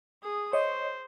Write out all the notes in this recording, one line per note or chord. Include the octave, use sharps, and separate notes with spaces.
G#4 D#6
C5 C#5 D#5